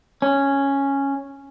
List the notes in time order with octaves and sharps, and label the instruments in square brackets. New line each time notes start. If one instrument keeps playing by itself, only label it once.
[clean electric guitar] C#4